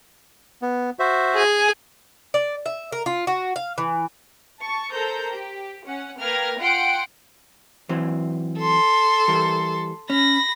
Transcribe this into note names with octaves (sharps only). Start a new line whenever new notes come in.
B3
F#4 C5 E5
G#4 G#5
D5
E5
A#4
F4
F#4
F5
E3
A5 C#6
A4 A#4 C5 A#5 G6
G4
C#4 F#5
A#3 B4 G5 F6 G#6 A#6
F4 F#5 G5 C6 D7
E3 F#3 C4
A4 C6
E3 G3 A#4
C#4 B5 A#6